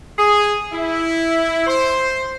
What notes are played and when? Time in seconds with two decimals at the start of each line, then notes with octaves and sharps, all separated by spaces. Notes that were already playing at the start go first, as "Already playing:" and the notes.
0.17 G#4
0.71 E4
1.66 C5